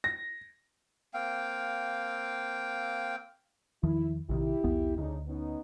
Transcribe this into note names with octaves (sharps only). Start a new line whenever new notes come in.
A#6
A#3 C4 F5 G5
E2 D#3 F3 E4
A#1 C3 D#3 E4 G4
B1 E2 B3
D2 C#3 D4 D#4
B3 C#4 D#4